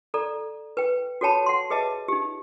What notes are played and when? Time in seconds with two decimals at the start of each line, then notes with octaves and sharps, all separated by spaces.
0.14 A4 D5 A#5
0.77 B4 G5
1.21 F#4 A4 C#5 G5 A5 B5
1.46 F#5 C6
1.70 G#4 B4 D#5 E5 A5
2.08 D#4 G4